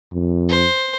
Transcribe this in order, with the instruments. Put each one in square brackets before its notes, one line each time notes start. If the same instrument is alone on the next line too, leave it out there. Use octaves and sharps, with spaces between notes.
[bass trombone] F2
[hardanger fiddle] C5